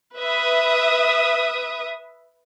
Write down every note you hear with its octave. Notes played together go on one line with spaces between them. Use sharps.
B4 E5 D#6